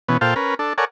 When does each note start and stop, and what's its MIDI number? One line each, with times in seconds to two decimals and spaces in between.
0.08 0.17 47
0.08 0.17 52
0.08 0.17 59
0.08 0.17 61
0.21 0.34 46
0.21 0.34 65
0.21 0.34 69
0.21 0.34 72
0.21 0.34 77
0.21 0.34 79
0.36 0.55 61
0.36 0.55 70
0.36 0.55 71
0.59 0.73 62
0.59 0.73 69
0.78 0.85 69
0.78 0.85 70
0.78 0.85 73
0.78 0.85 74
0.78 0.85 78
0.78 0.85 80